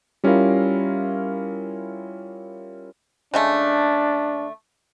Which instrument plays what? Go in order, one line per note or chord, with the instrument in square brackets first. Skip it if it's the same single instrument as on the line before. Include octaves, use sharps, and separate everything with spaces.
[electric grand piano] G3 C#4 E4 F4 A#4 F5
[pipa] C#3 G#3 A3 [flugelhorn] D4